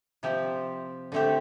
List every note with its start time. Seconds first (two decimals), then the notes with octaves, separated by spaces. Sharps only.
0.23 C3 F3 C4 G4
1.12 D3 A3 C4 G4